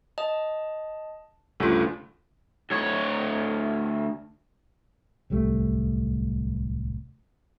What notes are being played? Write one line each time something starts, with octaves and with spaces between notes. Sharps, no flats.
D#5 A5
D2 G2 C#3 F4 A4
D2 C#5
D1 C2 G3 A3